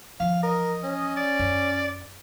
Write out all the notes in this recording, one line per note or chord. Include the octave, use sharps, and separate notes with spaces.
E3 F3 F5
A#4 D#5
C#4
D5
F#2